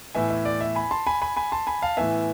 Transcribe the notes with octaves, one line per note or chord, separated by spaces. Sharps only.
A2 E3 B3 E5 G#5
E5
D5
E5
G#5 B5
A5 C6
G#5 B5
G#5 B5
G#5 B5
A5 C6
G#5 B5
F5 A5
A2 E3 B3 E5 G#5